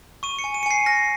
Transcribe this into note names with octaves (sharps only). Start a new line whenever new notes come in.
C#6 D#7
C#7
G#5
D#7
C#7
G#5 C7
F6 A#6